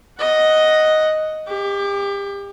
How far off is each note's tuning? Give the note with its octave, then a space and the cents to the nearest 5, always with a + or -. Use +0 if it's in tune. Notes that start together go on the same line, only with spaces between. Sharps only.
D#5 +0 F#5 +0
G4 +30 D6 -15